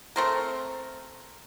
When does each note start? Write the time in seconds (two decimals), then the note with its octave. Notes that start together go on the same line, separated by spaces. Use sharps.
0.16 A3 C4 A#4